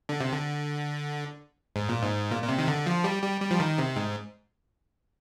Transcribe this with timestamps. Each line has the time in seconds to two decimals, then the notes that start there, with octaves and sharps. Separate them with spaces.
0.09 D3
0.20 C3
0.33 D3
1.76 G#2
1.89 A#2
2.02 G#2
2.31 A#2
2.43 A#2
2.48 C3
2.59 D#3
2.68 D3
2.86 F3
3.04 G3
3.23 G3
3.41 G3
3.51 F3
3.60 D#3
3.78 C3
3.96 G#2